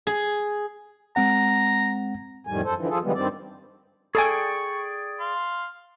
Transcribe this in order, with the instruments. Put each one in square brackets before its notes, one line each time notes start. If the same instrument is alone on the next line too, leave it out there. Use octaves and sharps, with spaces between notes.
[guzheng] G#4
[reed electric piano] G#3 C4 F#5 [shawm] A#5
[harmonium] F2 A2 D#3 G3 G#5
F#2 A4 C5
D3 E3 F3
F3 F4 G#4 A4
D3 E3 F3 G3 G#3 B3
G2 D#3 G3 C4 D5
[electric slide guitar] G#4 D5 G5 [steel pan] A4 G#5 [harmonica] C#6
[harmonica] F5 C6